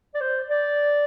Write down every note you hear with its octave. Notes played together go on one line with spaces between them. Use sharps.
D5
C5
D5